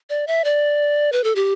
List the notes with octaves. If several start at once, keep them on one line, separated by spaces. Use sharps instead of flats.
D5
E5
D5
B4
A4
G4